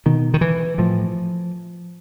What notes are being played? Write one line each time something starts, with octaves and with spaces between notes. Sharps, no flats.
B2 D#3
D#3
E3
A2 F3